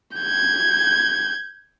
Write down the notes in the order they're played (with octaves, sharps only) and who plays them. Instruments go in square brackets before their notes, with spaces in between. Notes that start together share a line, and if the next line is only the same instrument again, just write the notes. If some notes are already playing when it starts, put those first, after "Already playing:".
[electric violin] G6 G#6